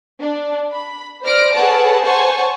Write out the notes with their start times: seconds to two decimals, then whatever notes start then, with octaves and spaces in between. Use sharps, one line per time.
0.21 D4
0.73 B5
1.23 C5 D5 F6 A#6 D7
1.54 G#4 A4 B4 C#5 F#5 A5
2.03 C5 C#5 F#5 G#5 A5 C#6